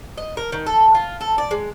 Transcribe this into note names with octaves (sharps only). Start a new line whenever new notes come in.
D#5
A#4
D#3
A4
F4
A4
D5
G#3